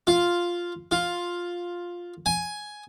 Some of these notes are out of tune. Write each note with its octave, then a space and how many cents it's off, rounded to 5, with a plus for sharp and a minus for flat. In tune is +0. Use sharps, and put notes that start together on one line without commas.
F4 +0
F4 +5
G#5 +5